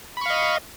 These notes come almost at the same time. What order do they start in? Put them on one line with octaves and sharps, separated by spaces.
B5 C#6 F5 D#5